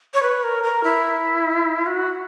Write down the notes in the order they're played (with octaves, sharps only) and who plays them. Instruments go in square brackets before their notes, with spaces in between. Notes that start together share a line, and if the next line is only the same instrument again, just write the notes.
[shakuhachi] C#5
B4
A#4
A#4
E4
F#4